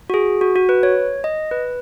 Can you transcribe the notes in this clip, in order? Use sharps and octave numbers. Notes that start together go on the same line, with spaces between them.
F#4
G#4
F#4
F#4
B4
C#5
D#5
B4